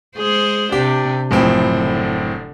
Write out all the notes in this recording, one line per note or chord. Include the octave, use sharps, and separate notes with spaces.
G#3 G#4 C5
C3 D4 G4
F#1 A2 F3 C4
D3